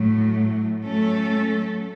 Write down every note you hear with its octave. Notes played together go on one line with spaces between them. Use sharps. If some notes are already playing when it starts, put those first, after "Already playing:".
Already playing: A2 F#3 A3
F#3 A3 C#4 A4